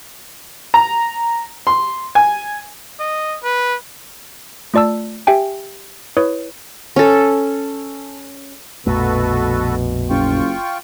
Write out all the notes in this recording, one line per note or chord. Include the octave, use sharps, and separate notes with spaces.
A#5
C6
G#5
D#5
B4
A3 F4 D5 A5 E6
G4 E5 G5 G#5
E4 B4 C#5 D#6
C#4 A4
A#1 F2 B2 A3 F#4 A4 B4
F#1 F4 G5 C#6